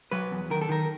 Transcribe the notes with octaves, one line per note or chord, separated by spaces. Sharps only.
F#3 B4
E2
D#3 A#4
A4
D#3 A#4